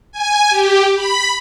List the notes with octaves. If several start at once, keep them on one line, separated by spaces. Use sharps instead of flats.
G#5
G4
B5